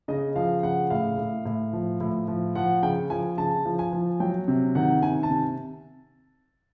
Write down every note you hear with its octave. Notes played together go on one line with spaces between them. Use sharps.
C#3 D#5
F3 F5
C#3 F#5
A2 F5
A2
A2
F3
A2
F3
F3 F#5
C#3 G5
F3 G#5
C#3 A5
F3
G#5
F3
F#3 G5
C3
D#3 F#5
C3 G#5
A5
C3